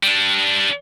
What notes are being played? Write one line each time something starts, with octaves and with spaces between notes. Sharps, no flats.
G3 D4